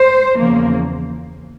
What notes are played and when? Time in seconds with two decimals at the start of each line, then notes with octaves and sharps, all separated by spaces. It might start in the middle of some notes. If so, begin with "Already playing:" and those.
Already playing: C5
0.36 E2 C#3 F3 A#3